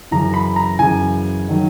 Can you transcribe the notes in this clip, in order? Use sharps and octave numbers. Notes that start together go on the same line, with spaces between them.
F#2 C#3 E3 A#5
B5
A#5
F#2 C#3 E3 G#5
D#3 F#3